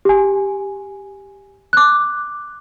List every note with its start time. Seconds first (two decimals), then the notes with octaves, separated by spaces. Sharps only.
0.05 G4 G#5
1.73 D6 F#6